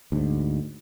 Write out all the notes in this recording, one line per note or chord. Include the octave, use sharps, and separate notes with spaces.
D2 G#2